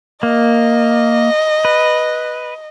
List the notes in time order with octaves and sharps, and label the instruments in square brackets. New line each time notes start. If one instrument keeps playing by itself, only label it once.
[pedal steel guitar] A#3 [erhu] D#5
[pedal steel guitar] B4